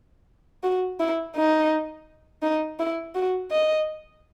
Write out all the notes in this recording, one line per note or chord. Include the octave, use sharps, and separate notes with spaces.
F#4
E4
D#4
D#4
E4
F#4
D#5